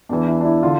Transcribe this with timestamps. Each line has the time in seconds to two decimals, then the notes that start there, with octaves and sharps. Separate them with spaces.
0.09 E2 E3 D4
0.27 E4
0.40 D4
0.45 E4
0.63 D3 F4